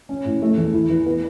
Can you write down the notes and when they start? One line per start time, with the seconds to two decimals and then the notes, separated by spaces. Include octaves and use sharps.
0.09 C#4
0.25 A2
0.42 A3
0.57 E2
0.74 E4
0.89 E3
1.06 B3